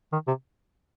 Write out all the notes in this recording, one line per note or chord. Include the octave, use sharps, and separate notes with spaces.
D#3
C3